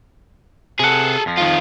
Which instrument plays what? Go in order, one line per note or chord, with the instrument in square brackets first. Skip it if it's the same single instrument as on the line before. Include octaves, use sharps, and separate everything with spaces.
[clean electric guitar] C3 F#5 [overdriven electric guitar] G#4 A4
[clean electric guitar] F2 F3
[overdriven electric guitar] D#3 F4